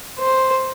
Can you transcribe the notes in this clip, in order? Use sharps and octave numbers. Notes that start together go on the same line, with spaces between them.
C5